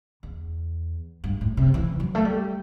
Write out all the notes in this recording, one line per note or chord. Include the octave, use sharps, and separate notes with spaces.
E2
G2
A2
C3
E3
F#3
A3
G3